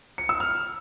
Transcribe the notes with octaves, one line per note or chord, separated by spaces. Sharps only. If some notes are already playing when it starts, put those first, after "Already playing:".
C#7
E6
F6